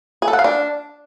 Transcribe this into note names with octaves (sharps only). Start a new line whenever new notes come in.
G#4
A4
F#5
F5
D4